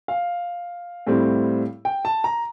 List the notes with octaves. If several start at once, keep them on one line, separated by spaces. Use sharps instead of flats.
F5
A2 G3 C4 E4
G5
A5
A#5